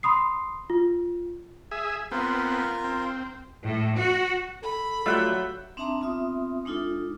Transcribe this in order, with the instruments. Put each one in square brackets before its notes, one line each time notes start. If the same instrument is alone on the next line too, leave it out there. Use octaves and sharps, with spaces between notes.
[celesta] B5 C6 D#6 C7
F4
[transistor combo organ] G#4 E5
[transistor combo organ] B3 C4 [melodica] F4 A#4
[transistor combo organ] C4
[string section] A2
F#4
[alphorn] A4 [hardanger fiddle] B5
[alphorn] F#3 [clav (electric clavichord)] G3 A3 F4 [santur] E5 F#5 G5
[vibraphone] C4 D4 D#4 E5 A5 A#5
B3 C4 F4 E5 D#6
G#3 D4 D#4 F4 A4